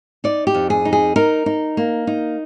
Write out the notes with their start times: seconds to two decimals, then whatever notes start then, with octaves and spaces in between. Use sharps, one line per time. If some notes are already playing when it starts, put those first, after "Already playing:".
0.24 D#4 D5
0.47 G4
0.54 F2
0.70 G#4
0.85 D#4
0.93 G#4
1.16 D#4 A#4
1.46 D#4
1.77 A#3
2.07 D#4